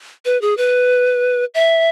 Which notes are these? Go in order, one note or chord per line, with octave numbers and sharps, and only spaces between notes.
B4
G#4
B4
E5